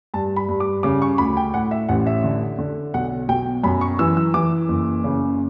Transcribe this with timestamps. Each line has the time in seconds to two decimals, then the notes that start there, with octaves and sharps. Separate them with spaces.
0.14 G2 A5
0.36 B5
0.49 G2
0.60 D6
0.83 C#3 D6
1.02 C#6
1.18 D2 B5
1.37 G5
1.54 A2 F#5
1.71 E5
1.89 A1 F#5
2.07 E5
2.24 D3
2.58 D3
2.94 B1 F#5
3.28 B2 G5
3.64 F#2 B5
3.81 C#6
3.99 E3 E6
4.17 E6
4.34 E3 D6
4.68 F#1
5.04 C#3